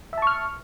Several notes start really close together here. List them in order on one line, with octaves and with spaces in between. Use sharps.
E5 A5 C#6 F6